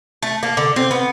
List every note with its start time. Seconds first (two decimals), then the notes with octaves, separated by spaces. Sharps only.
0.22 A3
0.43 A#3
0.57 D3
0.76 C4
0.91 B3